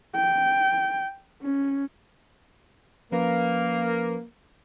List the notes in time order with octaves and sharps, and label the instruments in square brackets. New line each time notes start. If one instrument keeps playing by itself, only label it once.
[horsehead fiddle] G5
C#4
[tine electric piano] F3 C#4 B4 [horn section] A#3